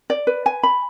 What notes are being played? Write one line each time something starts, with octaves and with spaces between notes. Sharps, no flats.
D5
B4
G#5
B5